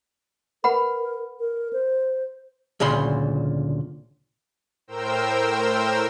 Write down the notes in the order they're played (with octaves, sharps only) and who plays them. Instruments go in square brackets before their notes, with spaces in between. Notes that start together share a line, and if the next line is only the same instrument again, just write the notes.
[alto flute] A#4 [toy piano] B4 F#5 B5
[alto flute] A#4
C5
[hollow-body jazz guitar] D2 A#2 C#3 B5 C6
[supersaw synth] A2 A#4 C5 G5 E6